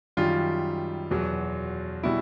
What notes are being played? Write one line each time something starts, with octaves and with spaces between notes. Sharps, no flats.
F#2 D#3 G3 F4
E2 B2 F#3
B2 G3 E4